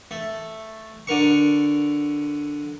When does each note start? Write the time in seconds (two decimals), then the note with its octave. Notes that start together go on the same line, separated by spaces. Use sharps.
0.11 A3
1.07 D3 A#4 C#6